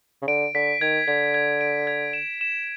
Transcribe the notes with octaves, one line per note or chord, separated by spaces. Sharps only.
C#3
D3 D7
D3 B6
D#3 G#6
D3 G#6
G#6
D7
G#6
E7
E7